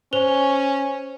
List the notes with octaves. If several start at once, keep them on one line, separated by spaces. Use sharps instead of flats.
C#4 C5 F7 G7